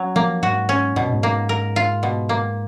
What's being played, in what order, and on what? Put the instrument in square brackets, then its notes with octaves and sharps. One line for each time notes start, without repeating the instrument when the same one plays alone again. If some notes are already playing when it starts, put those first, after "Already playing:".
Already playing: [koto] F#3 C#4
[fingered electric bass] F3 [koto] A#3
[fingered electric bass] G#2 [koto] F#4
[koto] C#4
[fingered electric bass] G#2 [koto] B2
[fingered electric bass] A#2
G#2
[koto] A#3
A#4
F4
B2
A#3